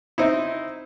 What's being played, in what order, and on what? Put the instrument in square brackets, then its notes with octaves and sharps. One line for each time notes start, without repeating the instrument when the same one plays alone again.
[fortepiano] C4 D#4 E4